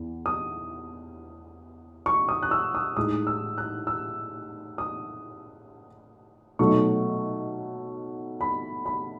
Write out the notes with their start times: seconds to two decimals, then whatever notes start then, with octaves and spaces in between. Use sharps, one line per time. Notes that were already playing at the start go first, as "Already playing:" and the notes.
Already playing: E2
0.26 D#6
2.06 C#6
2.29 D#6
2.43 F#6
2.51 E6
2.75 D#6
2.97 A2 G#3 D#4 D#6
3.27 E6
3.58 F#6
3.87 E6
4.78 D#6
6.59 B2 F#3 A3 D#4 C#6
8.41 B5
8.86 B5